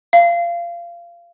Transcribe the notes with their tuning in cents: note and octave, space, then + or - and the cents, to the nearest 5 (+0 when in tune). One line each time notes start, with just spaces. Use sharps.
F5 -25